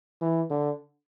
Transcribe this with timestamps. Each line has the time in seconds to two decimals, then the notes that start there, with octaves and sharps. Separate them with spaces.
0.22 E3
0.50 D3